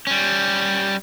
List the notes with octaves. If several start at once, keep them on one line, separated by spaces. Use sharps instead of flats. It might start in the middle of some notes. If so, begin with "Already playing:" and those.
G3 C#4